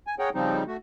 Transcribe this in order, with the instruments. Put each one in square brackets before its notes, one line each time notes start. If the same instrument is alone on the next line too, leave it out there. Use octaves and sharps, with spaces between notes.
[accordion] G#5
G#4 A#4 C#5 F#5 G5
C#3 F3 G3 C4 D#4
A3 F#4